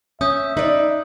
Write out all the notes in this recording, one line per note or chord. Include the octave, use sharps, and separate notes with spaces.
C#4 E5 D#6 G6
D#4 B4 D5